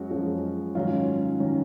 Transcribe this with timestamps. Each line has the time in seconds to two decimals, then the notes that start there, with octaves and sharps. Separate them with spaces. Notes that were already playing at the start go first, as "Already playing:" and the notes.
Already playing: F#2 F3 G#3 C#4 F#4
0.10 F#2 F3 G#3 C#4
0.75 G#2 D#3 F#3 C#4 F4
1.40 D#3 F#3 C#4